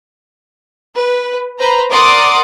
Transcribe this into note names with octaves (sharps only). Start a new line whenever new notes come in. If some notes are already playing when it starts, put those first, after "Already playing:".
B4
B4 C5 A#5
A#4 D5 F#5 C6 D6 D#6